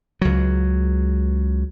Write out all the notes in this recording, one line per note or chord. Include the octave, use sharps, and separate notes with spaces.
C#2 F#3